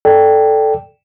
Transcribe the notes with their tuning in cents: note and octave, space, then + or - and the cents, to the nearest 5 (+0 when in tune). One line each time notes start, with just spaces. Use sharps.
A4 +0 D5 +0 G5 +0